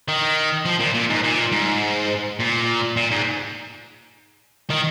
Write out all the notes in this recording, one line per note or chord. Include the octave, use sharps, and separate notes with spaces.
D#3
F3
A#2
A#2
G#2
A#2
G#2
A#2
A#2
G#2
D#3